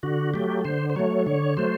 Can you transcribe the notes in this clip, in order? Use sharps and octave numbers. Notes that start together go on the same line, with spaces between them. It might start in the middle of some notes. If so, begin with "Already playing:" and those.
D3 F#4
F#3 A3 G4
D3 C5
C5
F#3 A3 C#5
D3 C#5
F#3 A3 C5